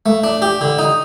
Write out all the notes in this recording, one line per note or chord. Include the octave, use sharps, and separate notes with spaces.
A3
D4
G4
D3
D#4